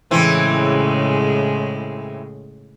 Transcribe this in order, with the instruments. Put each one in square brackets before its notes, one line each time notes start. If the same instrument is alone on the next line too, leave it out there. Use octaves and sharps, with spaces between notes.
[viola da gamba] A2 C#3 G#3 [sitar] E3 C4